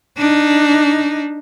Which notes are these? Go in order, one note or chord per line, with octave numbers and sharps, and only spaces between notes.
D4 D#4